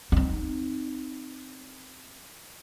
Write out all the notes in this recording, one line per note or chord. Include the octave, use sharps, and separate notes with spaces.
C4 D#4